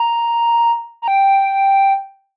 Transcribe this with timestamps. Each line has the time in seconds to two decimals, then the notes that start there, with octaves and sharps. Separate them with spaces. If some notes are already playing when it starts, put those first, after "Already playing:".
Already playing: A#5
1.02 A#5
1.08 G5